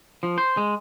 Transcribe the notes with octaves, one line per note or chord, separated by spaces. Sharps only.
F3
C5
G#3